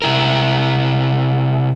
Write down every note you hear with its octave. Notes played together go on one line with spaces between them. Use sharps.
C3 E4 A#4